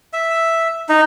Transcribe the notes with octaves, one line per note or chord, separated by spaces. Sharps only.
E5
D#4